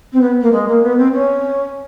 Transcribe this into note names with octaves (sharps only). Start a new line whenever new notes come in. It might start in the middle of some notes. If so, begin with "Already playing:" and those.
C4
B3
A#3
G#3
A#3
B3
C4
C#4